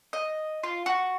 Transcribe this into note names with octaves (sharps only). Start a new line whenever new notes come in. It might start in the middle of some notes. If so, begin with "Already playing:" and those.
D#5
F4
F#4